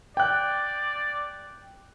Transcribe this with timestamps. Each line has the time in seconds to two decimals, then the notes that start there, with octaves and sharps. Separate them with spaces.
0.17 D5 G5 F#6